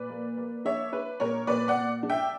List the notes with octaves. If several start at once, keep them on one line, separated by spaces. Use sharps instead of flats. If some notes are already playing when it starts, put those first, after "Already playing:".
Already playing: A#2 B4 D5
A#3
A#3
D4 C#5 E5
D4 B4
A#2 A#4 C#5
A#2 B4 D5
D5 F#5
A#2
D4
E5 G5